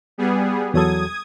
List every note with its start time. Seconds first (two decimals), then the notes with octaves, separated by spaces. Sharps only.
0.18 G3 B3 G#4
0.74 E2 F#3 A4 D#6 G#6